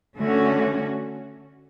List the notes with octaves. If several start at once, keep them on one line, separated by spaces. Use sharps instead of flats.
D3 A3 C#4 F#4